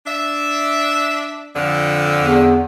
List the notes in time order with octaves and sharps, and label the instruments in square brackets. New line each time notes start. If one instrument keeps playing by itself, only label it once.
[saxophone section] D4 E5
F2 D3
[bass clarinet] E2